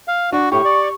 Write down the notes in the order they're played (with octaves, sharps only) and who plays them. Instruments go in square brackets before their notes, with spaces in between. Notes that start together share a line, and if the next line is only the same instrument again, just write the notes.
[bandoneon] F5
[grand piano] D4 [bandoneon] F#4
[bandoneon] A2 [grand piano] G4 [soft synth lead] C#6
[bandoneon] D5